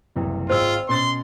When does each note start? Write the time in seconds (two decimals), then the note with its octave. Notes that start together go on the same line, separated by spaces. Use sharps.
0.16 F#1 C2 E3
0.50 G#1 G#3 F4 C5 E6
0.89 B2 C#4 C6 A6